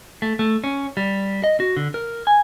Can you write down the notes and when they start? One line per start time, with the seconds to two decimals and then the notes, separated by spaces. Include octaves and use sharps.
0.22 A3
0.39 A3
0.64 C#4
0.97 G3
1.44 D#5
1.60 F#4
1.77 D3
1.94 A#4
2.27 G#5